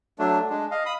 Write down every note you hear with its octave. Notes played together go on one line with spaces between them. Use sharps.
F#3 A3 D4
G#3 D4
D#5 F5
B5 D#6